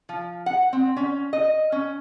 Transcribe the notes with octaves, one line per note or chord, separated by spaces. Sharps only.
F3
F#5
C4
C#4
D#5
C#4